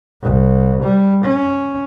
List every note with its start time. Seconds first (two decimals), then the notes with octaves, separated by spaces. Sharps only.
0.22 C2
0.83 G3
1.25 C#4